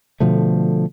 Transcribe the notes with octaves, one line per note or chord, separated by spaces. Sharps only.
B2 D3 F3 A3